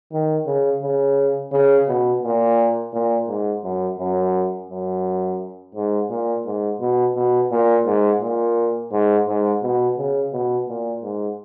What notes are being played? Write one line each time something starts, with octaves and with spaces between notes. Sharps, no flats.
D#3
C#3
C#3
C#3
B2
A#2
A#2
G#2
F#2
F#2
F#2
G#2
A#2
G#2
B2
B2
A#2
G#2
A#2
G#2
G#2
B2
C#3
B2
A#2
G#2